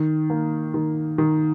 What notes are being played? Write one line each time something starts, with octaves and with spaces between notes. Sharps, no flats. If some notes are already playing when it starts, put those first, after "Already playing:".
Already playing: D#3
A#3
D#3
D#3